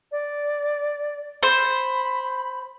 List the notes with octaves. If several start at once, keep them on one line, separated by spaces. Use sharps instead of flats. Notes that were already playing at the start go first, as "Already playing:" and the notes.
D5
C5 B5